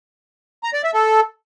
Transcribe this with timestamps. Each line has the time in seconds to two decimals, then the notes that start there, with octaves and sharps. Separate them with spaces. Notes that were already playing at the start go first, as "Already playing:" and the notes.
0.63 A#5
0.74 D5
0.84 E5
0.94 A4